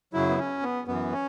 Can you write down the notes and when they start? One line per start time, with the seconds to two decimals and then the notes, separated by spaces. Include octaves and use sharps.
0.13 F#2 C#3 F#3 E4
0.29 B3
0.38 C#4
0.63 B3
0.87 F#2 E3 B3
1.12 C#4